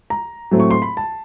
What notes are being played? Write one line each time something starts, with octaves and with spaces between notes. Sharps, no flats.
A#5
A2 F#3 A3 C4
C#6
C6
B5
A5